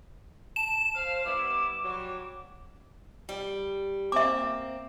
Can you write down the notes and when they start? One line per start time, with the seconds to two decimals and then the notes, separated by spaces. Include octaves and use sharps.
0.56 A5 E7
0.95 C5 F5
1.25 G3 B3 E4 D6
1.83 F#3 G3
3.29 G3
4.12 A#3 C4 E5 D6